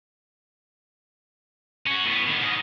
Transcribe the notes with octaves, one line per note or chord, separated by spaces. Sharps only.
C#4 F#4
A2 B3
D#3 B3
G#2 D#5